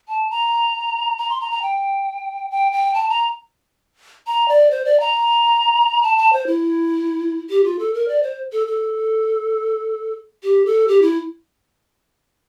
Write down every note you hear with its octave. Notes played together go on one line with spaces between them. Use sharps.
A5
A#5
A#5
C6
A#5
A#5
G5
G5
G5
A5
A#5
A#5
D5
C5
D5
A#5
A5
A5
C5
E4
G4
F4
A4
A#4
D5
C5
A4
A4
G4
A4
G4
E4